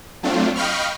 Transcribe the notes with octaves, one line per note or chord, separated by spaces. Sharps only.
F#3 A3 C4 D4 F4
D#5 F5 G5 B5 C#6 F6